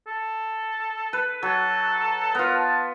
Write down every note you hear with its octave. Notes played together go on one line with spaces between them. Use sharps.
A4
B4
F#3 A4
B3 F4 A#4
A5